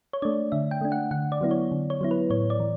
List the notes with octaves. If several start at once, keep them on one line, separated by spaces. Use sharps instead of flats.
C#5
A3 D4 D5
D3 E5
G5
A3 D4
F#5
D3 F#5
D5
F#3 B3 E4
C#5
D3
C#5
F#3 B3 E4
B4
A2 C#5
D5
E3